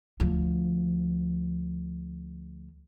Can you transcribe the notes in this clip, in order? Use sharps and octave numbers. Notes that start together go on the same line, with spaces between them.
D2 F3